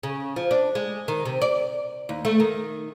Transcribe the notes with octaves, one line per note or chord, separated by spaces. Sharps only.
C#3
F3
D4
G#3
D#3
C3
D5
D#2
A3
D#3